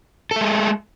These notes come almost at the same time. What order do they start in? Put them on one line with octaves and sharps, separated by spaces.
A4 A3 G#3